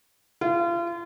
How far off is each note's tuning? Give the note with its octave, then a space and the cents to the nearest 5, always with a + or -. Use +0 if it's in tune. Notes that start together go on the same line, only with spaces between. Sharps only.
F4 -35